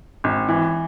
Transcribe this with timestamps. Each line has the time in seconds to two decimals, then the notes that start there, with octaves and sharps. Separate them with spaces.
0.24 G#1
0.49 E3